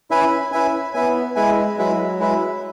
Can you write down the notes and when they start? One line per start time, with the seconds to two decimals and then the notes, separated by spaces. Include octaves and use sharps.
0.10 C#4 E4 B4 E5 G#5
0.52 C#4 E4 B4 E5 G#5
0.94 B3 E4 B4 E5 G#5
1.36 G#3 E4 B4 E5 G#5
1.78 F#3 G#3 E4 B4 E5
2.19 G#3 E4 B4 E5